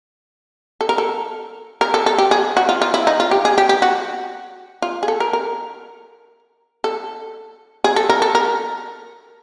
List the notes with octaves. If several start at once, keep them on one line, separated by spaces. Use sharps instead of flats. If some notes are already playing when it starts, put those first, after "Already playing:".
A4
A#4
A4
A#4
A4
A4
G4
G#4
F#4
F4
F4
E4
D#4
F4
G4
G#4
G4
G4
F#4
F4
G#4
A4
A#4
A#4
A4
G#4
A4
A#4
A4
A#4